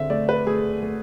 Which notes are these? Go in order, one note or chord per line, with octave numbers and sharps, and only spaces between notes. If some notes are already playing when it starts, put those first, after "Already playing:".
Already playing: D3 C4 E5
A3 D5
B4
A3 G#4
A3